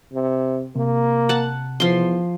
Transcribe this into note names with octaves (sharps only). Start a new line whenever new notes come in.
C3
C3 A#3
F#5 A5
E2 F3 C6